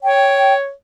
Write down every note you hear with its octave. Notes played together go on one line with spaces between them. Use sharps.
C#5 G5